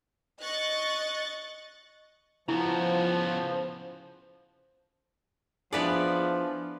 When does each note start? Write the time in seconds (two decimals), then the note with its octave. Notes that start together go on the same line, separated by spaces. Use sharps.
0.40 D#5 C#6 F#6 A6
2.48 C#3 F3 B3 E4
5.73 F3 B3 D4 E4 G#4 B4 D5